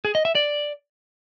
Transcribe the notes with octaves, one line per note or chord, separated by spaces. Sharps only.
G#4
D#5
E5
D5